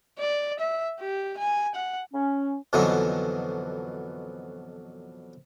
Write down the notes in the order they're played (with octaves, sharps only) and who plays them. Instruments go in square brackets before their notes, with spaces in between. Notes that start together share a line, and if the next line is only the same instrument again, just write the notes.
[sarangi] D5
E5
G4
G#5
F#5
[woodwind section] C#4
[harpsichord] F2 B2 D3 E3 F#3 D#4